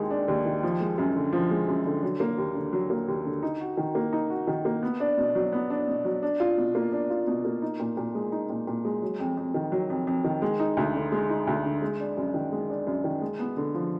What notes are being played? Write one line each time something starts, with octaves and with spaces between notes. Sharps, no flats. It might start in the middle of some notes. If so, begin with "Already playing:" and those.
Already playing: D#2 D#3 G#3
D4
D#2
D#3
F3
G#3
F#2
D3
F3
G#3
F#2
D3
F#3
A#3
D#2
D3
F#3
A#3
D#2
D3
D#4
F#4
D#3
A#3
D#4
F#4
D#3
A#3
B3
D4
B2
F#3
B3
D4
B2
F#3
D4
F4
B2
A#3
D4
F4
B2
A#3
D#4
A#2
A#2
G#3
D#4
A#2
A#2
G#3
F#3
F2
F2
D#3
F#3
F2
F2
D#3
G#3
D#4
D2
D3
G#3
D#4
D2
D3
G#3
D4
F#2
D#3
G#3
D4
F#2
D#3
G#3
B3
D3
F3